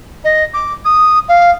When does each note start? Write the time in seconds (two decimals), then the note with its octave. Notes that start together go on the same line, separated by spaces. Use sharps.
0.24 D#5
0.54 D6
0.85 D#6
1.29 F5